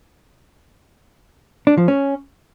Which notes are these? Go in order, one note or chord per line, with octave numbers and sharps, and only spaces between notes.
D4
F3
C#4